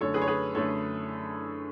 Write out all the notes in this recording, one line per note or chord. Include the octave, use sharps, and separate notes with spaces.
F#2 D3 A3 A4 C#5
G#4 B4
C#5
G#4 B4
F#2 D3 A3 A4 C#5